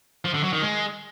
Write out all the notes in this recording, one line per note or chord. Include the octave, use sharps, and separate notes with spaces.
F3
D3
F#3
D#3
G#3